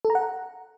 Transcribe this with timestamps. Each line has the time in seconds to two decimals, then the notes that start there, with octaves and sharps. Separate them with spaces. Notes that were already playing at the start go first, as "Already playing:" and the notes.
0.05 A4
0.10 A#5
0.15 F#5